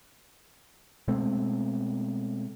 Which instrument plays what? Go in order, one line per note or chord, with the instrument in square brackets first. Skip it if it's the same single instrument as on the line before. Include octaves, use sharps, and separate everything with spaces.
[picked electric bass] B2 G#3 A3 C4